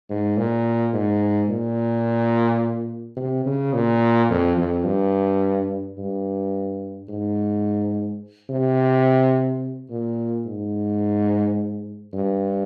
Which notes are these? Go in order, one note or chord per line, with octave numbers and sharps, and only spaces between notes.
G#2
A#2
G#2
A#2
C3
C#3
A#2
F2
F2
G2
G2
G#2
C3
A#2
G#2
G2